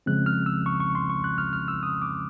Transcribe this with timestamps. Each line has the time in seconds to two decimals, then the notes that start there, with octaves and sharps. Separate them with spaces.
0.06 C#3 F3 G#3 C4 F#6
0.26 F6
0.46 E6
0.66 C#6
0.80 C#6
0.95 C6
1.10 C#6
1.24 F#6
1.38 F6
1.53 F6
1.68 E6
1.83 D#6
2.02 D6